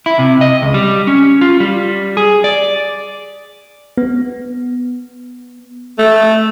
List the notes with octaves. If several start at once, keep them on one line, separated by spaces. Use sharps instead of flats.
E4
C3
D#5
C#2
G3
C#4
F4
G3
G#4
D5
B3
A3